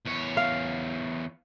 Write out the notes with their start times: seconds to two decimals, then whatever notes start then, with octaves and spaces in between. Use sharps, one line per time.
0.06 E2 C#5
0.37 F5